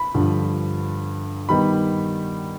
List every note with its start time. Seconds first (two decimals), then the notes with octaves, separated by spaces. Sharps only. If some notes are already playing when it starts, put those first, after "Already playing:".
Already playing: B5
0.14 G2 D3 F3
1.49 D#3 G3 B3 D#4 B5